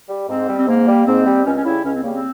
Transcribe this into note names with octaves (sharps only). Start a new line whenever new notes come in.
G3
G#2 C4
G3
C4
G#2 A#3
G3
G#2 C4
G3
C#2 C#4
C#4
C#3 G3 E4
C#2 C#4
C4
C#3 G3 A#3
C4